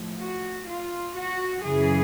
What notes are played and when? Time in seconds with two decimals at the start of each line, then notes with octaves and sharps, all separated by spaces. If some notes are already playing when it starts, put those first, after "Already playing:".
Already playing: A2 F3
0.18 F#4
0.67 F4
1.16 F#4
1.64 F#2 C#3 E3 G#4